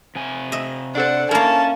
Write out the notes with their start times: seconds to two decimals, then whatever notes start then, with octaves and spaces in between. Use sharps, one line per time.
0.15 C3 G#5
0.52 D#5 E5
0.95 D4 A4 C5 F#5
1.31 A#3 C#4 E4 A#4 A5